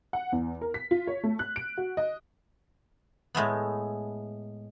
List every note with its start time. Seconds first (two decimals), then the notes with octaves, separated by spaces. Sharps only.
0.13 F#5
0.32 E2
0.61 A#4
0.74 B6
0.91 F4
1.07 C#5
1.24 A3
1.39 F#6
1.56 D7
1.77 F#4
1.97 D#5
3.35 A2 G#3 A3 B3